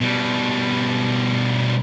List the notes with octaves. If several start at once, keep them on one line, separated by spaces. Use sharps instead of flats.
B2 G3